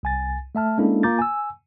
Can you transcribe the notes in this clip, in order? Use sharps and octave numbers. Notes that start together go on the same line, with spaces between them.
C2 G#5 A6
A3 E5 A5 F6
G#3 A#3 C#4 D4 E4 A4
A#3 F4 A#5 D6 G6 A6
G#5 E6